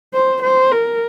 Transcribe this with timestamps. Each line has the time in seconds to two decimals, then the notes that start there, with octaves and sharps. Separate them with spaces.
0.14 C5
0.42 C5
0.71 A#4